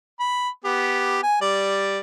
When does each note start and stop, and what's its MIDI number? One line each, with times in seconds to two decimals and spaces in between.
0.20 0.49 83
0.65 1.21 59
0.65 1.21 67
1.23 1.41 80
1.41 2.00 55
1.41 2.00 74